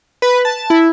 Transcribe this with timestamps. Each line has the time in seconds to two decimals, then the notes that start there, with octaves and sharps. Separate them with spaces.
0.22 B4
0.45 A5
0.70 E4